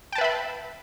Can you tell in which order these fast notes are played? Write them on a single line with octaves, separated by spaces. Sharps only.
G5 A5 B4 E5 B5